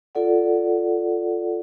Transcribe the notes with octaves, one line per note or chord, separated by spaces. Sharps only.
F4 A4 D5 F#5